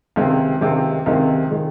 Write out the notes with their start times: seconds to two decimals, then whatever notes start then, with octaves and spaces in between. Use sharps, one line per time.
0.16 C#2 C3 D#3 G#3 C4
0.61 C#2 C3 D#3 G#3 C4
1.06 C#2 C3 D#3 G#3 C4
1.51 D#3 G#3